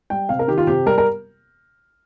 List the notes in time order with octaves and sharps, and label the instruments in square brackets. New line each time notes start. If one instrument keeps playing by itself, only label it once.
[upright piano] G3 G5
C3 F5
A#4
D#3 G4
F4
C3 G4
G3 A#4
A#4